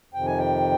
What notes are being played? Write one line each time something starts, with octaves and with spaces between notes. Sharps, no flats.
F2 C3 D#3 G5
G#5
G5